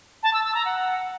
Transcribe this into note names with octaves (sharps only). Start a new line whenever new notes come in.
A5
E6
E6
A#5
F#5